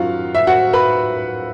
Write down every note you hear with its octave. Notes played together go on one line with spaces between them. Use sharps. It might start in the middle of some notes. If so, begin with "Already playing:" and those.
Already playing: F#2 D#3 F#3 F4 F#4 F5
E5
F#4 F#5
B4 B5